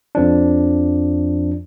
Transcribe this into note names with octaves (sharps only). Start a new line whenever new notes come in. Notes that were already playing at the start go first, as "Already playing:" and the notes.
F2 F3 D4